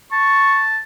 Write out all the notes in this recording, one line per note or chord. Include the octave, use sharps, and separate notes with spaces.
A5 C#6